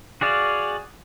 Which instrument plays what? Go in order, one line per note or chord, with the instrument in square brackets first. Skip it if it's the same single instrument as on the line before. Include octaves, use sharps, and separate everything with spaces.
[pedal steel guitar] F#4 G#4 D5 F5